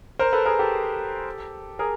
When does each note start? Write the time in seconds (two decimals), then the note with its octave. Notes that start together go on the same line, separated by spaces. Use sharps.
0.19 A#4 C5
0.33 A4 B4
0.46 G#4 A#4
0.59 G4 A4
1.79 G#4 A#4